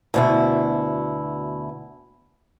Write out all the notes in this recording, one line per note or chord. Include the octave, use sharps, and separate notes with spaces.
D2 B2 E4